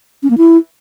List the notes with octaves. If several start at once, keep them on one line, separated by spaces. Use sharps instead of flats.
C#4
A#3
E4